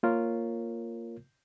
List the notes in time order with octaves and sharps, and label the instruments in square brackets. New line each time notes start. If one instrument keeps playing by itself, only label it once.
[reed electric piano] A#3 F4 A#4 C#5